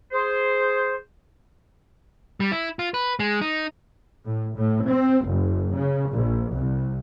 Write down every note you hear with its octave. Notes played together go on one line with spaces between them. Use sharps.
G#4 C5
G3
E4
F4
B4
G#3
D#4
A2
A2
C4
F#1
C#3
A#1
C2